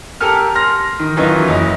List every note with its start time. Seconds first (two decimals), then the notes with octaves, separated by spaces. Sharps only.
0.21 G4 A4 A#4 G#5 F6
0.55 C6 F6 A#6
1.00 D#3
1.16 D#3 E3 F#3 C#4 D#4 F4
1.48 F#1 E4 D#5